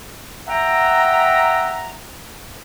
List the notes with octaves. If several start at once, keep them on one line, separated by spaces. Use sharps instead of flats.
E5 F#5 G5 A#5